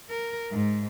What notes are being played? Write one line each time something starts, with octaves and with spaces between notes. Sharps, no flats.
A#4
G#2